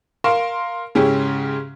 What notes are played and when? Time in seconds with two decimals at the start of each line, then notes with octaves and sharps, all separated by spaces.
0.24 A#4 F5 C6 E7
0.95 G#2 C#3 C#4 E4 G4